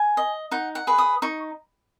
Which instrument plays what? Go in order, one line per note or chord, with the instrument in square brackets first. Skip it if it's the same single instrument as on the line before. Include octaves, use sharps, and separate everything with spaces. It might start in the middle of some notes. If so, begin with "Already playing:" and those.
Already playing: [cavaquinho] G#5
D#5
D#4 F#5
F#5
G#4 B4
D#6
D#4 C#6